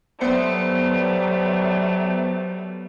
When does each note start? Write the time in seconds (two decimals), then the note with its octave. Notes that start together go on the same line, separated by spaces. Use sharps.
0.21 F#3 G3 A3 B3 C5 C#7